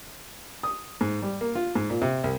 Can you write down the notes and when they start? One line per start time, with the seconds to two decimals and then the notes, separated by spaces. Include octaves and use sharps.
0.63 D#6
1.01 G#2
1.22 G3
1.41 A#3
1.55 F4
1.75 G#2
1.90 A#2
2.02 C3
2.24 C2